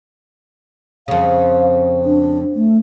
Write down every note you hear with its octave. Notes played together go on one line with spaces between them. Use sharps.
F2 C#3 F5
D4
A3